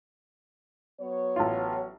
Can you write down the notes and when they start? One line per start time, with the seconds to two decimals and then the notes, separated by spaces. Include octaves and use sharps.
1.01 F#3 B3 C#5
1.36 A1 F4